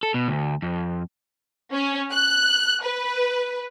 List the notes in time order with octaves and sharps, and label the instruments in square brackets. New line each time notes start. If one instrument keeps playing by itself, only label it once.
[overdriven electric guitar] A4
B2
D2
F2
[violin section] C#4
F#6
B4